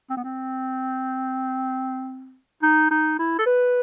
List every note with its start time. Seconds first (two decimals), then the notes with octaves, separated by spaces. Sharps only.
0.10 C4
0.17 B3
0.24 C4
2.62 D#4
2.91 D#4
3.19 E4
3.38 A4
3.46 B4